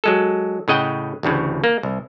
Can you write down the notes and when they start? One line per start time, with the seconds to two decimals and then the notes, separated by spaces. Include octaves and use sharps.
0.04 F#3 G#3 A4
0.68 A2 C#3 D#5 F#5 G5
1.23 A1 D2 A2 C#3
1.64 A#3
1.83 C2